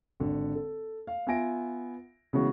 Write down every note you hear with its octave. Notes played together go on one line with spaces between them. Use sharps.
G#1 D3
A4
F5
B3 F4 E5 G#5 A#6 D7
C#3 E3 G#3 B3 C#4 F#4